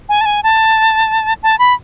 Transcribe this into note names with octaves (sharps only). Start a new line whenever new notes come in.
G#5
A5
G#5
A5
A5
B5